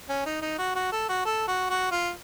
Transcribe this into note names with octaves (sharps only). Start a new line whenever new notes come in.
C#4
D#4
D#4
F#4
F#4
A4
F#4
A4
F#4
F#4
F4